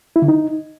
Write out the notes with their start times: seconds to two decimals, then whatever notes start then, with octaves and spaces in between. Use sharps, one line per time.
0.16 E4
0.22 D3
0.28 D#4